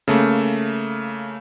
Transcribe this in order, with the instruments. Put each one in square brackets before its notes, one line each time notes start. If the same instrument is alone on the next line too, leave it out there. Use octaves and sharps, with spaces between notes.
[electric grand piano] C#3 A3 A#3